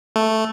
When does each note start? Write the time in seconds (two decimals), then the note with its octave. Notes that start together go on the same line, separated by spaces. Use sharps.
0.16 A3